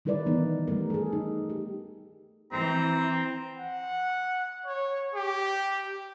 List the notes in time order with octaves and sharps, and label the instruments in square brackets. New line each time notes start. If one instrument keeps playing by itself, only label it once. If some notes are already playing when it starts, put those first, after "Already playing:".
[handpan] D#3 G3 E4 A#4 B4 D5
E3 B3 D#4
G3 A3 A#4
G#4 A4
D#4
G4
[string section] E3 [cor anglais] C4 [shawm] A#5
[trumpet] F#5
C#5
G4